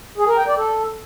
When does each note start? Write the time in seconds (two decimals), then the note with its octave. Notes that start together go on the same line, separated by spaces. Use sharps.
0.18 G#4
0.27 A#4
0.37 G5
0.47 D5
0.57 A4